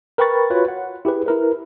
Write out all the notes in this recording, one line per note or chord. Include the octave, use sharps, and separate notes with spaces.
A#4 B4 G5 B5 C#6 A6
F4 F#4 B4 C#5
F#5
E4 G4 G#4 B4
E4 A#4 B4